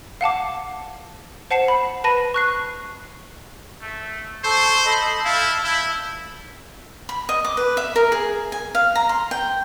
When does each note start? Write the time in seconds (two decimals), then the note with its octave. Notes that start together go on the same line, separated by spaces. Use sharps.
0.21 F5 F#5 A5 D6
1.51 C5 F#5 A5 C7 C#7 E7
1.68 B5
2.04 B4 A5 B5 A#6 D#7
2.34 C#6 F#6 C7
3.82 A3
4.44 A4 C5 C#6
4.85 A4 D#5 B5
5.25 E4 F5 A5 G6
5.64 E4 E6 G6
7.09 B5
7.29 D#5
7.45 D6
7.57 B4
7.77 E5
7.96 A#4
8.12 G#4
8.52 G#5
8.75 F5
8.96 A#5
9.09 C6
9.31 G5